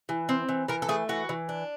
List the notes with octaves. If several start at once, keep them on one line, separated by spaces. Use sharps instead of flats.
E3
C4
E3
E3 A#4
A4
A3 G#4
E3 F#4
E3
D4